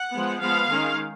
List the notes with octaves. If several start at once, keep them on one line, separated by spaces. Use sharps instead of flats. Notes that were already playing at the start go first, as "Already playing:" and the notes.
Already playing: F#5
F3 G#3 B3
F3 G#3 B3 F5
D#3 G#3 C#4